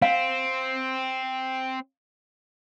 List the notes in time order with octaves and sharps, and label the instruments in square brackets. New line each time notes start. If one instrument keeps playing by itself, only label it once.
[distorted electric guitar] C4 [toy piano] F5